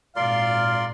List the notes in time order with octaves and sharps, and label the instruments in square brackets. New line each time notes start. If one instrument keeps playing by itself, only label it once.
[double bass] G#1 A#2 [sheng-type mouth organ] F4 D5 [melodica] A#4 C6 [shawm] F5